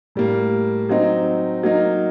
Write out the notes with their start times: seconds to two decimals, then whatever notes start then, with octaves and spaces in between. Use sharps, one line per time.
0.15 A2 G3 A#3
0.89 F#3 C4 D#4
1.63 F#3 A#3 D#4